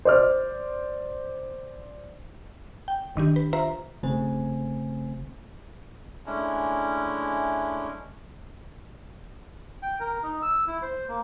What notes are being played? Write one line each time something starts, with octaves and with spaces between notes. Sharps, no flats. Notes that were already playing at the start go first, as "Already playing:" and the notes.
C5 D5 F6
G5
G1 D#3 D4 G4
B4
F4 B4 C5 E5 A#5
G1 C#3 A3 C4 C5 G#5
G#3 A3 C#4 D4 E4
G5
A#4
D#4
E6
E4
C5
A#3